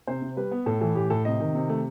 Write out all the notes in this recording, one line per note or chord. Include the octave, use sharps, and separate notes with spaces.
C3 C5
C3
G3 B4
B3
A2 A4
E3 A4
A2 G4
A2 A4
C3 D#5
D#3
C3
A3